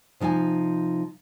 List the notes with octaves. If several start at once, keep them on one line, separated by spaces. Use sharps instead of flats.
C3 F3 D#4 E5 G#5